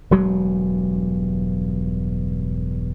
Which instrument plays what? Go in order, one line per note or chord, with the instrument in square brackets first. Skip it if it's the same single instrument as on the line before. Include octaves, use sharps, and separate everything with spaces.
[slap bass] E1 G2 F#3 G#3